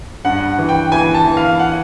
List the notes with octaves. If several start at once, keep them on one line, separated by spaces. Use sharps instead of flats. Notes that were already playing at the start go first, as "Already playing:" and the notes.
G2 F#5
E3
G5
E3 G#5
A5
E3
F5
F#5